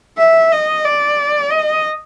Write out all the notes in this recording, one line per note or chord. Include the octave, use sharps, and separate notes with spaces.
E5
D#5
D5
D#5